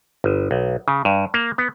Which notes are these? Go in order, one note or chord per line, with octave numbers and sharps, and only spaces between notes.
G1
B1
C#3
G2
A#3
B3